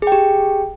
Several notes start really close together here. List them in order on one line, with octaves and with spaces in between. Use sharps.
G#4 G5 G4